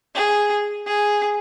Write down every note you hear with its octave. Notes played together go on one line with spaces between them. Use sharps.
G#4
G#4